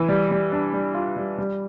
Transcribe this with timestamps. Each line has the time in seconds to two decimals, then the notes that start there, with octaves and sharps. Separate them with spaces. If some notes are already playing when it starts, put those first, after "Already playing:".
Already playing: E3
0.09 G3
0.31 G3
0.52 D4
0.73 G3
0.94 F4
1.16 G3
1.38 G3